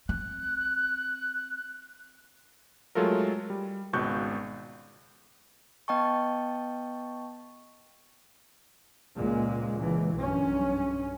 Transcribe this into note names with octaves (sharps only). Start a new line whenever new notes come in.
C4 F#6
F#3 G#3 A3 F4 A4 A#4
G3
G#1 C#2 B2 C#6 F#6 G6
B3 D#5 G5 A5 C#6
C#2 A#2 G#3 A#3
C#2 E3
B1 G2 C#4